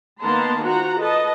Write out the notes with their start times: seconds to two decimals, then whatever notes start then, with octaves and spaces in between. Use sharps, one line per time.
0.22 D#3 A#3 B3 A5 A#5 C6
0.64 F4 F#4 C5 F#5 A#5
1.00 A4 B4 D#5 A5